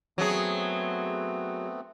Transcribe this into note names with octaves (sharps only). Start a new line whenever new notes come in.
F#3 A3 B3 C4 G#4